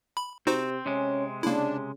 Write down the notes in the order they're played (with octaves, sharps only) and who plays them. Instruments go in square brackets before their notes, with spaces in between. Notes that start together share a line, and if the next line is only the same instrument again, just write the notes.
[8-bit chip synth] B5
[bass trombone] C3 [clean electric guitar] C4 [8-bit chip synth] D#4 F#4 C5
[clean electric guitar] C3 G#3 [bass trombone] C#4
[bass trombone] C#3 [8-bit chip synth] A#3 E4 [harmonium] D4